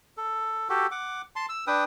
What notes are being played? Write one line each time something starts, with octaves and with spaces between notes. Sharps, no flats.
A4
F#4 G4 A4
F#5 D6
A5 C6
E6
D4 B4 G5 D#6